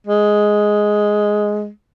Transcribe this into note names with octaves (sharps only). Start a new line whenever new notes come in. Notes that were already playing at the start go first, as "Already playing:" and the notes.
G#3